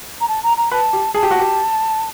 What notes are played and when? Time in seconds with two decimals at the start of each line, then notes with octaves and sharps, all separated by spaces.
0.20 A#5
0.28 A5
0.43 A#5
0.57 A#5
0.72 B4 A5
0.93 G4
1.14 G#4 A5
1.23 G4
1.31 F#4
1.39 G4